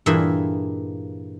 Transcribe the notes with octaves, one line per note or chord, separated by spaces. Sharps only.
G2 A#2 E3 A#3 G#4 E5